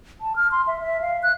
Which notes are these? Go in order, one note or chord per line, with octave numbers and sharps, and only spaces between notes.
A5
F6
C6
E5
E5
F5
F#6